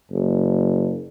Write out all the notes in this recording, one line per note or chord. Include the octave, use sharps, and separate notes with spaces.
F#1